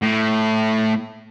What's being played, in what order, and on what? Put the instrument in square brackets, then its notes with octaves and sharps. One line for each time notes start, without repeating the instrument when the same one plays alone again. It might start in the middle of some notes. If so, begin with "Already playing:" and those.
[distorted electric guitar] A2